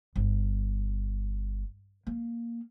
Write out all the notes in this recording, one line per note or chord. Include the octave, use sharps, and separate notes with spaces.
G1
A#3